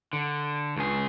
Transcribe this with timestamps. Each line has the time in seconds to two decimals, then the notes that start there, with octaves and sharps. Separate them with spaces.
0.13 D3
0.76 C#2 G#4